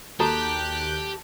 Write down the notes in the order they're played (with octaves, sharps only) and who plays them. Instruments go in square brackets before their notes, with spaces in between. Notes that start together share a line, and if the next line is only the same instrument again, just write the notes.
[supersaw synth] D#2 F#6 G6 [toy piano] F#4 A4 A#5 [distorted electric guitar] G4 [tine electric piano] A5